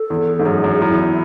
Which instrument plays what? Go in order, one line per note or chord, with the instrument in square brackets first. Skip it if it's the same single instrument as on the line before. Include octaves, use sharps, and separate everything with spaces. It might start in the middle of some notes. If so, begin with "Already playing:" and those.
Already playing: [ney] A4
[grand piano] E2
G#2
[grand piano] F#2 [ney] G#4
[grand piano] F#2
[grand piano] F#2 [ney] E4
[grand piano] E2